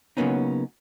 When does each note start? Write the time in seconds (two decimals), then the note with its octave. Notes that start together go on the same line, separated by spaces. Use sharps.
0.17 C#3 F#3 A#3 B3 C#4 D#4